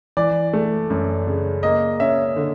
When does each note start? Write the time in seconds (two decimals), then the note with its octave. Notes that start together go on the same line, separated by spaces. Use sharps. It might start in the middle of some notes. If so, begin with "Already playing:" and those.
0.17 E3 D5
0.53 A3
0.90 F#2
1.27 C#3
1.63 A#3 D#5
2.00 C#4 E5
2.36 D3